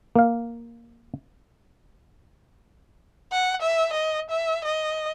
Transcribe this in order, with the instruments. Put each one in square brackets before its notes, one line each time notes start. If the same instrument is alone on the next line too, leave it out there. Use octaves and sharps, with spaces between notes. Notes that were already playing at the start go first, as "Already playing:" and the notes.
[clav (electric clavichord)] A#3 F5
[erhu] F#5
E5
D#5
E5
D#5